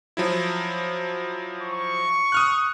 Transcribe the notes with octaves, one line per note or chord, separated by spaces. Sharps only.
F3 F#3 E4
C#6
D#6 F6 F#6